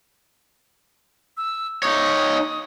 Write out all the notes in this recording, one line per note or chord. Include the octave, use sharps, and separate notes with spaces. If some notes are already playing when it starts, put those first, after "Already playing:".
E6
D#4 C#5 D#6